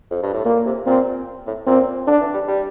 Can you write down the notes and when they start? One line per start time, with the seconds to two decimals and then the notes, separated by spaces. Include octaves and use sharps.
0.11 F2
0.23 G2
0.34 A2
0.45 A#2 A#3
0.66 C3
0.86 A#2 C4
1.47 A2
1.67 A#2 C4
2.07 D3 D4
2.21 E3
2.34 G3
2.48 G3